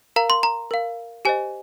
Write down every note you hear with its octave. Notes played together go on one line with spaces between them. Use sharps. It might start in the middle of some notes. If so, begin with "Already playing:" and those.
A#4 F5 A#5
C6
A#5
A#4 F5
G4 C5 D#5 G#5